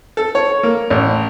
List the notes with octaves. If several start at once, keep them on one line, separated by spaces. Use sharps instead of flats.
A4
C#5
A#3
A1